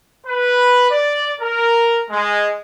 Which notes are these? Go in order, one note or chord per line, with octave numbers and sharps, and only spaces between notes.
B4
D5
A#4
G#3